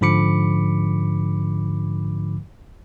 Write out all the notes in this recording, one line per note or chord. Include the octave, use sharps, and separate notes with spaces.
G#2 D3 F3 B5 D6 C#7